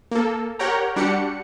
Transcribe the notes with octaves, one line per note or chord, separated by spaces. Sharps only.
A#3 A4
G4 A#4 C#5 F#5 G5 A#5
G3 D4 F#4 G4 F#5 C#7